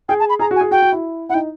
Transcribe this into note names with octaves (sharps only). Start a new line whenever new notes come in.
G#4 G5
A5
B5
G#4 A#5
F#4
G#5
G#4
F#4 G5
F#4
E4
E4 F#5
D#4 G5